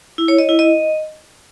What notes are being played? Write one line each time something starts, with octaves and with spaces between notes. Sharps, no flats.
E4
C#5
D#5
E4
D#5